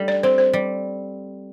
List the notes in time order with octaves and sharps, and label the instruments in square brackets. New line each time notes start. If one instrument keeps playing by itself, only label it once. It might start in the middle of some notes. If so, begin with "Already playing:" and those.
Already playing: [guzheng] G3 A3 D4
[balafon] D5
[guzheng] C4 [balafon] C5
[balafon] C5
[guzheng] G3